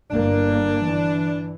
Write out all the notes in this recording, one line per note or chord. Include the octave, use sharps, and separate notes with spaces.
G1 G2 A#3 D4
E3